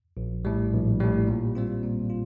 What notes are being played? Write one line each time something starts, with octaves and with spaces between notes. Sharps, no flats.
A#1
A2 G3
A#1
A2 G3
A#2
G3 C4 F4
A#2
F4